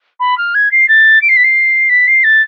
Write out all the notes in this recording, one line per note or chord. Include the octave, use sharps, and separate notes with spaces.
B5
F6
G#6
C7
A6
D7
C7
B6
C7
B6
C7
A6